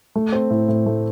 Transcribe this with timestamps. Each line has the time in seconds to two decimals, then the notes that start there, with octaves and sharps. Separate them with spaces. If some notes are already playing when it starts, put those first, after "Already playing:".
0.15 A3
0.32 C4
0.50 A2
0.68 A2
0.86 A3